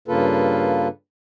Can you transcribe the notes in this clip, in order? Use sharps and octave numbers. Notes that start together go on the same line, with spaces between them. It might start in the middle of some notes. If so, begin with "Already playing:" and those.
G2 C#3 A#3 F4 A4 B4